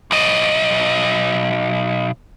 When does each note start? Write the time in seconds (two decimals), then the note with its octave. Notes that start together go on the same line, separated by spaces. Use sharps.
0.11 B1 D#5